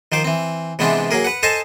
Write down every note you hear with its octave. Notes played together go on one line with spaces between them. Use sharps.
D#3 F3 C5 D6
E3 C4
C3 E3 G#3 B3 C4 D4
F#3 A#3 G#4 A#4
B4 F#5
A4 C5 D#5 G#5 A5